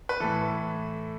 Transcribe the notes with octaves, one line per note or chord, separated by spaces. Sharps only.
B4
A2 E3 A4